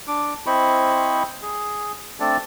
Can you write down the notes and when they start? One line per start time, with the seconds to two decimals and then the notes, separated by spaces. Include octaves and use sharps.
0.08 D4 D6
0.47 C4 E4 C5 D#5 B5 C#6
1.42 G#4
2.20 A3 C4 D4 A4 D5 A5